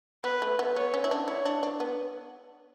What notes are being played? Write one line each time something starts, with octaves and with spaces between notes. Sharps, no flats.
B3 B4
A3
B3
B3 C#5
C#4
E4
D4
E4 C#5
D4
D4
B3